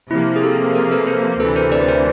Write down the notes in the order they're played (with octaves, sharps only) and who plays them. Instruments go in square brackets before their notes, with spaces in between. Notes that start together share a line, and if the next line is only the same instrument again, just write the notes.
[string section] C3 F3 A#3 [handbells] E4
[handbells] G#4
G4 A4
G#4 A#4
A4 B4
A#4 C5
[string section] D2 C3 E3 [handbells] A4 B4
[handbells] A#4 C5
C5 D5
B4
A#4 C5